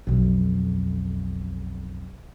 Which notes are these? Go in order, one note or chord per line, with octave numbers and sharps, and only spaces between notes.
B1 F2